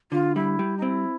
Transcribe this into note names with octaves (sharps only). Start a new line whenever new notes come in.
D3 F4
G3 E4
G3
D#4
C4 E4